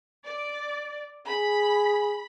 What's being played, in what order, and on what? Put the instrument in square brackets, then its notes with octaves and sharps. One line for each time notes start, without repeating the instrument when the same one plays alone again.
[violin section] D5
[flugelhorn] G#4 [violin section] B5